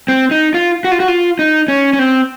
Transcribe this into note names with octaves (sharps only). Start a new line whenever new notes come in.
C4
D#4
F4
F#4
F4
F#4
F4
D#4
C#4
C#4
C4